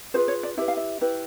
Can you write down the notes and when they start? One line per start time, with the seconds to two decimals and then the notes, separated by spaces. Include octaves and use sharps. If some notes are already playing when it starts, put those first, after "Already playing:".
0.14 F4 G#4 B4 C5
0.28 C#5
0.43 D5
0.57 E4 G4 B4 E5
0.68 F5
0.77 E5
1.01 E4 G4 B4